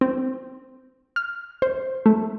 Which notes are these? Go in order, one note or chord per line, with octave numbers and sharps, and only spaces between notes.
C4
F6
C5
A3